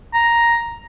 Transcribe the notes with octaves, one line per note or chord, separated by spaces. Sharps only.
A#5